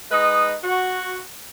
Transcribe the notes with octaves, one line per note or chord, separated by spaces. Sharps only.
G#3 D#4 B4 D#5
F#4